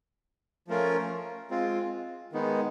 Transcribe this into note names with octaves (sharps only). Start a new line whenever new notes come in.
F3 A3 C#4 F4 A#4
G#3 C4 F4
D#3 G#3 B3 D#4